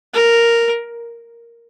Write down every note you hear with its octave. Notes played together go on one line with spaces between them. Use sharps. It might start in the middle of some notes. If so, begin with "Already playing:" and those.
A#4